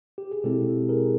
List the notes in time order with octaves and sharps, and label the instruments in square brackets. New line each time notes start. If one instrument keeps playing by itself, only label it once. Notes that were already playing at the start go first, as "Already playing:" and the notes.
[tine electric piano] G4
G#4
B2 G#3 C4 E4 G4 A4
G#4 A#4